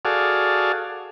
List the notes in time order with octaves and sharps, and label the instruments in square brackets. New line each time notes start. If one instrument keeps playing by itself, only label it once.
[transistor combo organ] F#4 G#4 A4 D5 F5